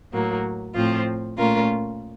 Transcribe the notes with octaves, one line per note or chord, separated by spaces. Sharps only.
A2 F#3 A#3
A2 F3 C4 F4
A#2 A3 C#4 F4 A#4